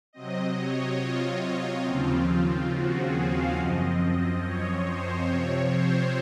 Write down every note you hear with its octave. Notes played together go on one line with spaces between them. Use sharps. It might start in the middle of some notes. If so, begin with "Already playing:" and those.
C3 F#3 C4 D#5
C#5
F4
D#2 C#3 F3 C4
F#4
G#4
F5
F#2 F3 C4 D#5
C#5
C5
C3 F3 C4 C#5
C5